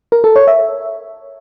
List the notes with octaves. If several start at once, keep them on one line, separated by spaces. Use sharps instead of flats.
A#4
A4
C#5
E5